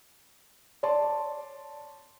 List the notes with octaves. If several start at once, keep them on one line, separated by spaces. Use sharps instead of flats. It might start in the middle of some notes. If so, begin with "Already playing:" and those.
C#5 D5 A5 C6